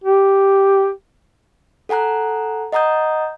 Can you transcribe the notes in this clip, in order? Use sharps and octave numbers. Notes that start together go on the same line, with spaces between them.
G4
A4 F#5 G#5 A#5 F#6
D#5 F#5 A#5 D#6 G6